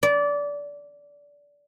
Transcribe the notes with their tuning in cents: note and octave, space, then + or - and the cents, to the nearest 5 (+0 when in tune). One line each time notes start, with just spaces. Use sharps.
D5 -20